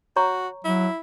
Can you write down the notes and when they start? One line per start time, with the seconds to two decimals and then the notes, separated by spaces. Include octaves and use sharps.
0.16 F#4 C#5 A#5 C#6
0.64 F#3 E4